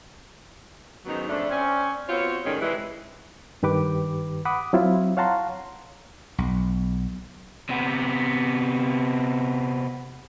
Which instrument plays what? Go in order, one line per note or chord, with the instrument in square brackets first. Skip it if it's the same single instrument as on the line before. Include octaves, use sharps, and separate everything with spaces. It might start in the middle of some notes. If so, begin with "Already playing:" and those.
[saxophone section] G#2 D#3 F#3 B3 C#4 D#4
F2 C#3 A3 D4
C4 C#4 D5
B3 C4 F4 F#4 C#5
A2 C3 D#3 G#3 C#4 D4
C3 E3 G#3
[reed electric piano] G2 D#3 G4 B4 D6
F#5 B5 D6 D#6
F#3 C4 E4 F4
C#5 F5 F#5 A5 A#5 C6
[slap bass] B1
[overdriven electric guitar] C3 B3